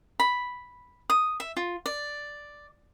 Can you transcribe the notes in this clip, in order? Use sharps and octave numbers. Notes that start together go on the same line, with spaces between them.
B5
D#6
E5
F4
D5